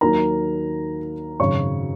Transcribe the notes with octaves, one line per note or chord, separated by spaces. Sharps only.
D#2 D#3 F#3 A#4 A#5
G#1 F#2 C#3 F#3 C#5 C#6